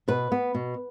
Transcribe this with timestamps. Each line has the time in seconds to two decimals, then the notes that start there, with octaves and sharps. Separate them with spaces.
0.08 B2 B4
0.32 B3
0.55 B2